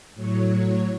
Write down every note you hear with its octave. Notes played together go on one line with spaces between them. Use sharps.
A2 F#3 C#5